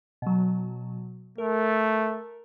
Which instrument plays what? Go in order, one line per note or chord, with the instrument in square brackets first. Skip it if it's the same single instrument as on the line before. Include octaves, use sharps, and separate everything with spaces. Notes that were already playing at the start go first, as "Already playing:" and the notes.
[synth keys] B2 F#3
[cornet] A3 [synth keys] A#4